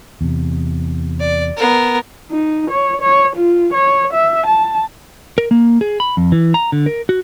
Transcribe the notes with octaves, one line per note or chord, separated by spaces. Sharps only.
E2 C3
D5
B3 A#4
D#4
C#5
C#5
F4
C#5
E5
A5
A#4
A#3
G#4
B5
F2
E3
A#5
D3
A#4
F#4